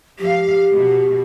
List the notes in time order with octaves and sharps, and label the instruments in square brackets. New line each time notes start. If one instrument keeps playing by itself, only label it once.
[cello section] F3 F5 [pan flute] G4
[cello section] B2 F#4